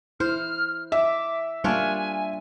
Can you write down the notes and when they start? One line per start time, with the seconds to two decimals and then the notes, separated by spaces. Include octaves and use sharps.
0.20 E4 C5 F6
0.92 E5 D6
1.64 G3 A#3 D4 F4 C#5 G#5